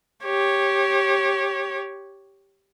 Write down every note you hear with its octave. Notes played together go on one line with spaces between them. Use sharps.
G4 C#5